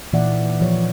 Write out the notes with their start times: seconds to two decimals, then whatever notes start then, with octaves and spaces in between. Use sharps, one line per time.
0.13 A#2 E3 D#4 D5 E5 F#5
0.61 F3 C#5